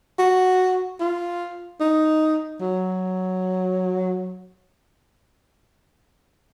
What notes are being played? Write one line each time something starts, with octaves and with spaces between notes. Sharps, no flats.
F#4
F4
D#4
F#3